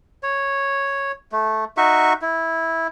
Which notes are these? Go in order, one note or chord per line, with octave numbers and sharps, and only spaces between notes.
C#5
A3
D#4 F#4 E5 C#6
E4